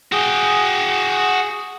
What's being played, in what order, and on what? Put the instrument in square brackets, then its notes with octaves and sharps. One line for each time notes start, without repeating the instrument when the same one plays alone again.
[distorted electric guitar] F#4 G5 [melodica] G#4